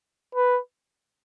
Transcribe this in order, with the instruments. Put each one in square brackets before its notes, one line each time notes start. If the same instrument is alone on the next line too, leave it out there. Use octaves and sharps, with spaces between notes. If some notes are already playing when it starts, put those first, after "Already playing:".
[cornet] B4